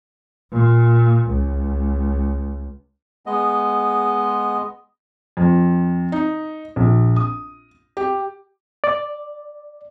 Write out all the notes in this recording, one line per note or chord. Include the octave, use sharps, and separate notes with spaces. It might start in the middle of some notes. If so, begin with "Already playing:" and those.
A#2
C#2
G#3 B3 D#5
F2
D#4
A#1
D#6
G4
D5